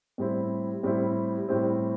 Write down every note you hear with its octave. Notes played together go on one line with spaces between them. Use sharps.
A2 G3 C4 E4
A2 G3 C4 E4
A2 G3 C4 E4